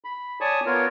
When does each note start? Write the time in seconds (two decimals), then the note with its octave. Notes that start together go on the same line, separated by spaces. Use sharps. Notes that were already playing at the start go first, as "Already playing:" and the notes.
0.04 B5
0.41 C#5 D5 G#5 A5 C#6 D#6
0.66 B3 F4 A#4 C#5